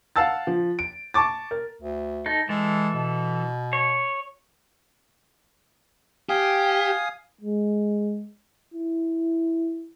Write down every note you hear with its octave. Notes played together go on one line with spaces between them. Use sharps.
F5 F#5 A5 E6 A6
F3
D7
A5 C#6 D6 A6
A#4
D2
D#4 A4
E3 G#3 A4
B2
C#5
G4 F5 G#5 D#6
G#3
E4